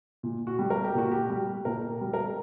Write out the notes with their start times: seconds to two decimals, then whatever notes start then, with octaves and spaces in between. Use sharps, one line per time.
0.23 A#2
0.47 F#4
0.59 G3
0.70 A#4
0.84 G4
0.95 A#2 F#4
1.12 G4
1.30 G3
1.65 A#2 A#4
2.01 G3
2.13 A#4